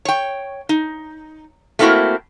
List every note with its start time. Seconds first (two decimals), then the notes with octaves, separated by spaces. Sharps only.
0.05 C#5 G5
0.69 D#4
1.79 A3 A#3 C4 E4 F#4 A#4